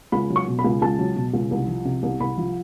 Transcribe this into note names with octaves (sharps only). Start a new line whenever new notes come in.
C#2 B5
F#3
C#6
B2
B5
C#2
C#2 A5
F#3
B2
C#2
C2
F3
C3
C2
C2 B5
F3